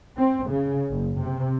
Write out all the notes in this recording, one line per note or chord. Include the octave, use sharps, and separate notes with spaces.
C4
C#3
F#1
C3